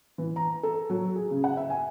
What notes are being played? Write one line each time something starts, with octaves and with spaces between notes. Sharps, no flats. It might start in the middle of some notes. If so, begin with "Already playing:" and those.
E3
A#5
A4
F#3
G#4
C#3
F#5
E5
G#5